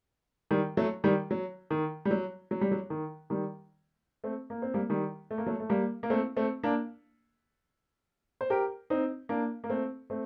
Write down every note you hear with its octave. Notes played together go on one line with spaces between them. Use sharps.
D#3 G3
F#3 A3
D#3 G3
F#3
D#3
G3
F#3
F#3
G3
F#3
D#3
D#3 G3
A3 C4
A#3
C4
G3 A#3
D#3 G3
A3
A#3
F#3 A3
A3
G3 A#3
A#3
A3 C4
A3 C4
A#3 D4
C5
G4 A#4
C4 D#4
A#3 D4
A#3
A3 C4
A3 C4